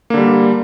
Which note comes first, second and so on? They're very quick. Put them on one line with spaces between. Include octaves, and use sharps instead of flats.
A#3 D3 G3